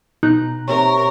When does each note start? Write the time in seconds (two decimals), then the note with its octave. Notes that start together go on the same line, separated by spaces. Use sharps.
0.23 B2 D#4 A#5 F#6
0.68 C3 A#4 C#5